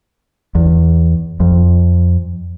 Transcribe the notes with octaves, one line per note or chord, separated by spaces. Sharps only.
E2
F2